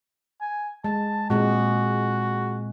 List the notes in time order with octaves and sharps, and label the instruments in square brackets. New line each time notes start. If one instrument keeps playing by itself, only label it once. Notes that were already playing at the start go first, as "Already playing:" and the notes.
[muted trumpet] G#5
[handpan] G#3 [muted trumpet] A5
[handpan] A#2 G#3 C4 [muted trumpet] F#4